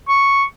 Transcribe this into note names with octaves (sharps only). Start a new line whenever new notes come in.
C#6